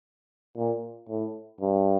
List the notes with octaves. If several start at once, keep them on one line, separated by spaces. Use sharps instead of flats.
A#2
A2
G2